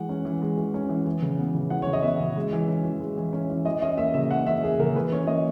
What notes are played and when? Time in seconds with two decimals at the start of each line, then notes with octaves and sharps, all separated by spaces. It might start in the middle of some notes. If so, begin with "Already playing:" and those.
Already playing: E3 G#3 F#5
0.09 C#4
0.25 E3
0.42 G#3
0.57 E3
0.74 C#4
0.89 E3
1.06 E3
1.22 C#3
1.38 B3
1.54 C#3
1.70 E3 F#5
1.82 C#3 C#5
1.93 D#5
2.03 B3 E5
2.20 C#3
2.36 G#3
2.53 E3
2.68 C#4
2.84 E3
3.00 G#3
3.17 E3
3.33 C#4
3.50 E3
3.65 E3 D#5
3.82 C#4 D#5
3.97 A#3 E5
4.14 C#3 E5
4.30 E3 F#5
4.46 C#4 E5
4.63 A#3 G#4
4.79 C#3 A#4
4.95 E3 B4
5.12 C#4 C#5
5.27 A#3 D#5